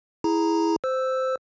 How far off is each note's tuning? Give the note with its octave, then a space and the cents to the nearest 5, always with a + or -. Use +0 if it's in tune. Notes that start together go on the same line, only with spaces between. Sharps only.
E4 +0 G#4 +5 A#5 +0
C5 -10 E6 +0